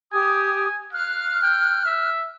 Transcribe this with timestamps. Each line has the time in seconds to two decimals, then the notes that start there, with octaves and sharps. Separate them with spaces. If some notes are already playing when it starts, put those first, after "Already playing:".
0.13 G4 G#5 D#6
0.93 F5 F6 F#6
1.42 G5
1.85 E5